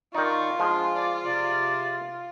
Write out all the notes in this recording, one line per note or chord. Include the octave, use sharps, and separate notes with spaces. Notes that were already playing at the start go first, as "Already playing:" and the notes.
D#3 D#4 F4 D5 C#6
F3 G#3 D4 C6
D5
C3 D5